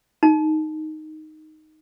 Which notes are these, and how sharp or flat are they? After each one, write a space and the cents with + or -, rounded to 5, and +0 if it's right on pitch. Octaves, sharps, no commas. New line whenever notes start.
D#4 +0 A#5 -40